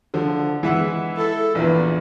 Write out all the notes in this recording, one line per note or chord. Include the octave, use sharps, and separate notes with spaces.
D3 F3
E3 G#3 E5 F#5
E4 A4
A#1 E2 E3 D4